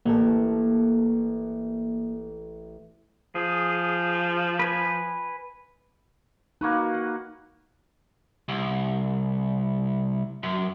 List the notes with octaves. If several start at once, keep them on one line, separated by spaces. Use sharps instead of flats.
A1 A#3 A4
F3 G#4
B4 G#5
A#3 D#4 F#4 B4
F#5
C2
F#2